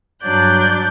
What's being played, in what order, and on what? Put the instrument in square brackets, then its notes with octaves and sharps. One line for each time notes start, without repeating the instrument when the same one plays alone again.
[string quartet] G2 F#3 D4 D5 F#6 G6